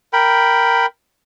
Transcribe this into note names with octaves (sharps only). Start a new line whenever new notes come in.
A#4 G5 B5